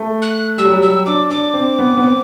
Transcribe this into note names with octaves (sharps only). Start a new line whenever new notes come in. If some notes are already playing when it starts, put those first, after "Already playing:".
Already playing: A3
F#6
G3 E6
F#3
G3
F#3 E6
D4 D6
D4 D6
C4
B3
B3
C4